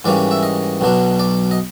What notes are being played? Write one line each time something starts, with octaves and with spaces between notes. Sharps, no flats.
G#2 E3 G3 A#3 C#4 D5
E5
D#5
B1 B2 F#3 B3 D4
D5
D#5